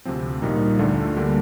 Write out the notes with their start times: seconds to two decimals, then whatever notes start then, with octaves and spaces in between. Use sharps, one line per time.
0.05 D2 C3 F3 C4
0.42 A#1 A#2 G3 A#3 D#4
0.79 D2 D3 A3 D4 F4
1.16 D2 D3 G3 A#3 D4